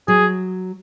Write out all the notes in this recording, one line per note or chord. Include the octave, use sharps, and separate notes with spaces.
F#3 G#4